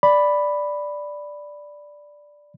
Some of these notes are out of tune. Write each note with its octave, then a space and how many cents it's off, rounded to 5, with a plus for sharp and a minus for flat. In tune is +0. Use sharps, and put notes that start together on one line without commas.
D5 +0 B5 +0